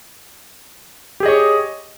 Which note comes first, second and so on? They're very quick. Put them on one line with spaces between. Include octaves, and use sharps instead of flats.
G4 G#4 D#5 C#5